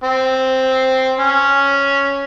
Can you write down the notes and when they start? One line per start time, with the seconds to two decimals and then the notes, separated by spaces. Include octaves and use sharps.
0.04 C4
1.19 C#4